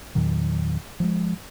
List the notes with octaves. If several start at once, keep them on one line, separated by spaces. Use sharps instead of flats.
E2 A#2 D#3 F#3
F3 G3 G#3